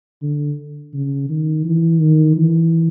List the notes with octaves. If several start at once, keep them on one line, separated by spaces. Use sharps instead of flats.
D3
C#3
D#3
E3
D#3
E3